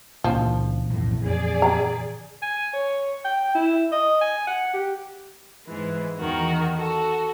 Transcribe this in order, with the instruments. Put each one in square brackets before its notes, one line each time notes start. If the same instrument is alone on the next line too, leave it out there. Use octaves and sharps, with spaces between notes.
[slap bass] C#2 D4 [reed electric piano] A#2 C#3 E3 [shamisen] F3
[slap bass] B1 F2 [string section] A2
[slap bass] F2 [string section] G#4 D5
[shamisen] A#5
[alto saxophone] G#5
C#5
G5
E4
D#5
G#5
F#5
G4
[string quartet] G#2 E3 G#3
E2 D#3 F#4 A#4
F#4 A4